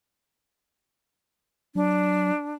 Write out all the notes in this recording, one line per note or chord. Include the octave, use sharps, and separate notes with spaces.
F#3 D4